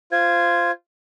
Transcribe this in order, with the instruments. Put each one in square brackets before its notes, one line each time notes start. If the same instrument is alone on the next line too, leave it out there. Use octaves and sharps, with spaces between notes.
[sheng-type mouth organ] F4 C5 [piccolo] G#6